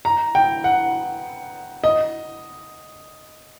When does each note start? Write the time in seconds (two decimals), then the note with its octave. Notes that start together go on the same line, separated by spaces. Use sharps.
0.05 A#5
0.35 G5
0.64 F#5
1.84 D#5